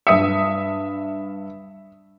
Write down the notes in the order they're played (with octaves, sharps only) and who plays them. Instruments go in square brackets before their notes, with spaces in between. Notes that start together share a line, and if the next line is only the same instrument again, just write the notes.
[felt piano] G2 D#6 C#7 [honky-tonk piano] E5